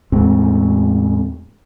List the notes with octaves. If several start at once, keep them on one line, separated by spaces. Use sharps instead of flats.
E2 A2 G#3 C4